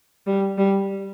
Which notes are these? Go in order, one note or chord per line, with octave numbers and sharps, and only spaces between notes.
G3
G3